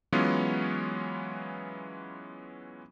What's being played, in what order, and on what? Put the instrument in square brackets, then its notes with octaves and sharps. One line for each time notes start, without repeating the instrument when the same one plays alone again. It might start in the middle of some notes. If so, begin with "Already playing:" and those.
[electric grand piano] E3 F#3 G#3 B3 C#4 F4